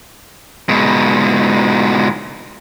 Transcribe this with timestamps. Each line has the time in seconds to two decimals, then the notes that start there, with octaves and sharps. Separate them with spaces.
0.69 G#2 B2